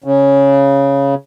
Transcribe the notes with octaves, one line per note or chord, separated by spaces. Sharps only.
C#3